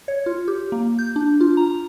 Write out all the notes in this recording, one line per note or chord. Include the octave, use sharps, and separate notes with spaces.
C#5
F4
G4
A#3
G6
D4
F4
A#5